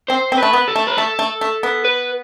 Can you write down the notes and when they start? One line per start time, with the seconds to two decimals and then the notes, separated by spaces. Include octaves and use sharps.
0.09 C4 C5
0.32 C4
0.38 A3 B4
0.53 B3
0.68 A4
0.76 A3
0.87 B4
0.97 A3 A4
1.19 A3
1.41 A3
1.63 B3
1.85 B4